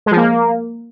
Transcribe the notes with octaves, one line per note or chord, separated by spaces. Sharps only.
G#3
F3
A#3